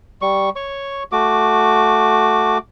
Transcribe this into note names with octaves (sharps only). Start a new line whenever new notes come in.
G3 C#6
C#5 C#6
A3 F#4 D6